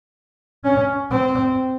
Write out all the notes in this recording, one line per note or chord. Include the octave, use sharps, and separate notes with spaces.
C#4
C4